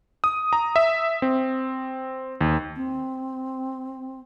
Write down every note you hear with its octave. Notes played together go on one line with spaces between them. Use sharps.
D#6
A#5
E5
C4
D#2
C4